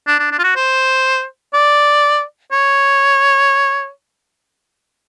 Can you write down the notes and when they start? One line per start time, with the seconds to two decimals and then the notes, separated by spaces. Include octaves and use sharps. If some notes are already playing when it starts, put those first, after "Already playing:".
0.07 D4
0.19 D4
0.32 D4
0.39 F4
0.44 F#4
0.56 C5
1.54 D5
2.52 C#5